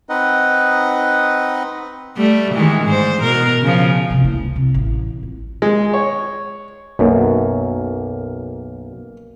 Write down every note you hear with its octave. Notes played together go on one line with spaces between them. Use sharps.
C4 D#4 B4 D#5 F#5
G3 A3
D#3 E3 G#3
G#2 C5
B2 A#4
C#3 F3
G2 C3
A#3 E4
C#2
C3
A1
F2
G#3
C#5
B1 F#2 A#3